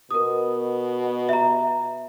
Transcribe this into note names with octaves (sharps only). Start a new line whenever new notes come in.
B2 A#4 D#6
E5 A#5